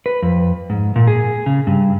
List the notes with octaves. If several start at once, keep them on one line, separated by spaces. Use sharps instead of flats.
B4
F2
G#2
A#2
G#4
C#3
G2